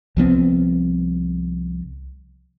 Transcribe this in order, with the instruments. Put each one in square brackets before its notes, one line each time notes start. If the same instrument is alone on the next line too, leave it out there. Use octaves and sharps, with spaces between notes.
[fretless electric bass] C2 F3 B3 C4